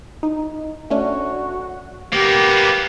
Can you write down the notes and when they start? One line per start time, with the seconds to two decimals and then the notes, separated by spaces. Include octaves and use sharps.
0.23 D#4
0.90 A3 C#4 D4 F#4
2.13 A#3 B3 G4